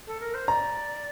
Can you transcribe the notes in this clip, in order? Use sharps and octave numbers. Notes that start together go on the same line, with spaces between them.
A4
A#4
C5
D5 A#5